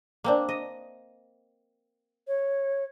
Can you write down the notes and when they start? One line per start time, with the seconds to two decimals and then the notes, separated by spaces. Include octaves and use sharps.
0.24 A#3 C4 D4
0.49 D#5
2.28 C#5